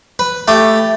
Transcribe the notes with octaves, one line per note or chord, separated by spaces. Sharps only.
B4
A3 G4